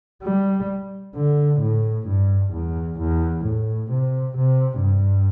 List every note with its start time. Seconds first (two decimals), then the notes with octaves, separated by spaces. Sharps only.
0.23 G3
1.16 D3
1.61 A2
2.08 G2
2.53 E2
3.00 E2
3.45 A2
3.92 C3
4.37 C3
4.83 G2